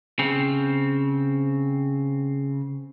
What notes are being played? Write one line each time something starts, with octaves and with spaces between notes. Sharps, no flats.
C#3 C4